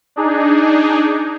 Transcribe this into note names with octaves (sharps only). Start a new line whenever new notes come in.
D4 D#4 G#4